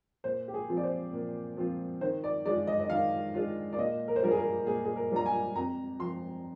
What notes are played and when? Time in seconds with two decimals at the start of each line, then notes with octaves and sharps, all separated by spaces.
0.24 A#2 C5
0.48 G4
0.54 G#4
0.69 F3 C4 F4
0.77 D5
0.83 C5
1.13 A#2
1.57 F3 C4 F4
2.01 D#3 C5
2.24 D5
2.46 G#3 D4 F4 D5
2.67 D#5
2.80 D#5
2.90 D#3 F5
3.34 G#3 D4 F4
3.73 D5
3.78 A#2 D#5
4.08 A#4
4.16 C5
4.23 G3 A#3 D4 F4 A#4
4.31 G#4
4.37 A#4
4.67 A#2 G#4
4.85 G#4
4.96 A#4
5.11 G3 A#3 D4 F4 A#5
5.26 G#5
5.55 F2 A#5
5.99 C3 F3 C6